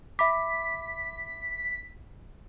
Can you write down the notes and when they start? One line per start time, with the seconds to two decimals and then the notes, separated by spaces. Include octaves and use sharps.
0.19 E5 B5 D6 B6